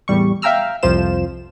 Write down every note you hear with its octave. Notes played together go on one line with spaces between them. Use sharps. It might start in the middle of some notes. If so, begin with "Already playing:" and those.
E2 A2 G3 C#6
E5 F5 G5 A#5 E6 F6
C2 F2 F3 F4 C5 E7